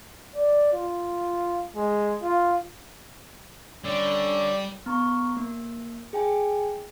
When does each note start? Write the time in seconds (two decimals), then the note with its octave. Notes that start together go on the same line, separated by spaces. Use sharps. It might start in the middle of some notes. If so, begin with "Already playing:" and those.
0.35 D5
0.73 F4
1.76 G#3
2.23 F4
3.84 D3 G3 C#4 D5
4.86 B3 A#5 C#6
5.37 A#3
6.13 G#4 G5 G#5